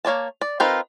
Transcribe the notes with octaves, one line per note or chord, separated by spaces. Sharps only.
A#3 C#5 D5 A5
D5
C4 D#4 F4 A#4 B4